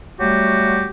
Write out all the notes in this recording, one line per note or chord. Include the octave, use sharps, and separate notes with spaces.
F#3 G3 A3 F#4 G4